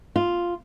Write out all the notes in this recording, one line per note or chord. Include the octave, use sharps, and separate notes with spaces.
F4